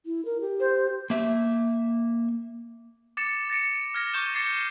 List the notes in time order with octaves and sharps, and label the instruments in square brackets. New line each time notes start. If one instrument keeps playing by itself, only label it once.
[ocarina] E4
A#4
G4
[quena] C5
[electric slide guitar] A#3 E5
[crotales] D6 A6 C#7 E7
A6 A#6 C#7 D7
F6 G#6 A#6
C#6 D6 G6 E7 G7
D6 G#6 A6 C7 C#7 E7